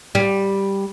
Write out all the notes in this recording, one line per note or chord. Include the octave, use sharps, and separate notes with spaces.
G3